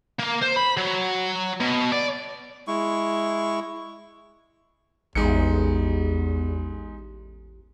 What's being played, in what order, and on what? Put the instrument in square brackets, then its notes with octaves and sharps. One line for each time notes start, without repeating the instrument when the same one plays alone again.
[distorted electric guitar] A#3
C5
B5
F#3
B2
D5
[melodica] G#3 E4 C#6
[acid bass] A1 [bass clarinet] E2 [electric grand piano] G#3 D#4 C#7